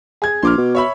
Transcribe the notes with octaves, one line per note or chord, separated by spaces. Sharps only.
G#4 G#6
A#1 C6 D6 F6
B2
C#5 E5 B5